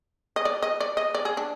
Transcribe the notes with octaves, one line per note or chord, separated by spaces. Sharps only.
D#5
D5
D#5
D5
D#5
D5
G#4
D4